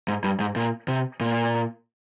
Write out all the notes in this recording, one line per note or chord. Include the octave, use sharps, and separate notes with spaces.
G#2
G2
G#2
A#2
C3
A#2